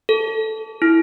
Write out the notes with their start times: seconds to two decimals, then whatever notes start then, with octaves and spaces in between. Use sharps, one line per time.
0.09 A4
0.82 E4